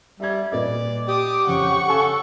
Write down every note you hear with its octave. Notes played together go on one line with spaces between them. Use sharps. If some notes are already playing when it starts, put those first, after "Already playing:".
G3 E5 G#6
A#2 B4 D5 D#5
G4 D6 D#6
F2 C#3 F#5 C#6
C#3 A4 F5 G#5